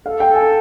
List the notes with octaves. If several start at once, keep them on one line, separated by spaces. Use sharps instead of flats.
A4 F5
G5
A4
G#5